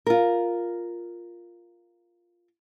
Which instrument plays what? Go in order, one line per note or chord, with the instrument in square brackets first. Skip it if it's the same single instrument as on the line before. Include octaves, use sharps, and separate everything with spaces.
[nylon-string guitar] F4 A#4